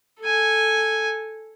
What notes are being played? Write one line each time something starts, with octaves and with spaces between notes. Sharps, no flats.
A4 G#5